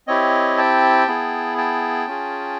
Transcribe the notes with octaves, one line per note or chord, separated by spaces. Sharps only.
C4 E4 G4 C#5 D#5
G5 A5
B3 E4 G#4
G5 A5
C#4 F4 G#4